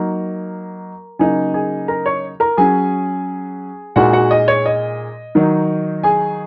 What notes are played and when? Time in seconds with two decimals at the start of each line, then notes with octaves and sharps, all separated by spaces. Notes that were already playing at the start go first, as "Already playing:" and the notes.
Already playing: F#3 A#3 D#4 A#4 A#5
1.19 C#3 F#3 A#3 D#4 G#4 G#5
1.54 G#4 G#5
1.88 A#4 A#5
2.06 C#5 C#6
2.40 A#4 A#5
2.57 F#3 C#4 G#4 G#5
3.96 A#2 G#3 D#4 F#4 F#5
4.13 F#4 F#5
4.31 D#5
4.48 C#5
4.66 D#5
5.35 D#3 F#3 D#4
6.04 G#4 G#5